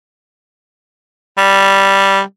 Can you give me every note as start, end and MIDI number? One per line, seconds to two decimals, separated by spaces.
1.38 2.21 55